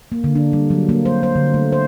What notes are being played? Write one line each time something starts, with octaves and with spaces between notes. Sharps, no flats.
A#3
D3
D4
G3
F#3
A#3
C5
C5
D3
A3
C5